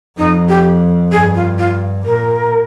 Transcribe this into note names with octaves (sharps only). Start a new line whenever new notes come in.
F2 D#4
G4
G2 G#4
F4
F4
A#2 A#4